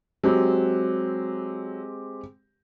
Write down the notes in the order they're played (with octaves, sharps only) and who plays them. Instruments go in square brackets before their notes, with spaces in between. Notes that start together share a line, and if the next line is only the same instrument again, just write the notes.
[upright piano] F#3 [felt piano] G#3 C4 G4